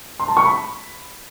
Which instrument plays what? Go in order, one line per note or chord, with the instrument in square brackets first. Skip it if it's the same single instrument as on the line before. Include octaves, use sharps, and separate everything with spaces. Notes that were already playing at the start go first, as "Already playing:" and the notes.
[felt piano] C6
A5
C#6
B5